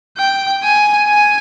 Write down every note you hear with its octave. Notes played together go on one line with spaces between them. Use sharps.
G5
G#5
G#5